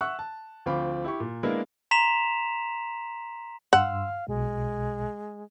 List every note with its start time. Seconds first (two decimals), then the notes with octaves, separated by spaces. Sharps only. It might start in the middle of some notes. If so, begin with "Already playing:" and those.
0.01 E5 F#5 C#6 E6 F#6
0.19 A5
0.66 D2 F3 C4 F4 B5 D6
1.04 E4 G4 C#6
1.20 A#2
1.43 G#3 A#3 B3 D4 E4 A#4
1.91 A#5 C6 B6 E7 F7
3.73 G2 F5 F#5 C6 E6
4.28 B1 B2 G#3